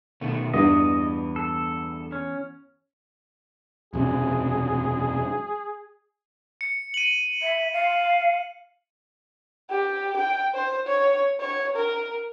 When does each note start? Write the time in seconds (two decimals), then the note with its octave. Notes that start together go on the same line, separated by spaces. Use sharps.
0.21 B2 D#3 A3
0.54 E2 G2 E3 B3 D#5
1.36 A4
2.12 C#4
3.93 E1 F#2 C3 G#4
6.61 C#7
6.94 D#7 F#7
7.42 E5
7.73 F5
9.70 G4
10.17 G5
10.54 C5
10.87 C#5
11.40 C#5
11.76 A#4